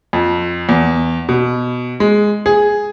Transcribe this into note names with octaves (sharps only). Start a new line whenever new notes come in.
F2
E2
B2
G#3
G#4